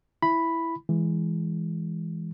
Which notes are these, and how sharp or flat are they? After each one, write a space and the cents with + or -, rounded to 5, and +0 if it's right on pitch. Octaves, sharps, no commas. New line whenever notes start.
E4 +0 B5 +0
E3 +0 G#3 +0